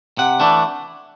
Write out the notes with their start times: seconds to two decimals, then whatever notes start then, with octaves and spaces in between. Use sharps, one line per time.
0.18 C3 F#5
0.40 E3 A3 D4